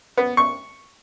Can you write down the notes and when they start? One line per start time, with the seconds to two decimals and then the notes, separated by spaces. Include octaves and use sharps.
0.17 B3
0.37 C#6